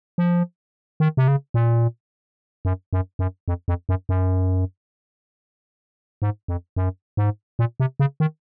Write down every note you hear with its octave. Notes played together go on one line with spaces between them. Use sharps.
F3
D#3
C3
C#3
A#2
F#2
F#2
F#2
F2
F2
F#2
F#2
G#2
F2
F#2
G#2
A#2
C3
C#3
D#3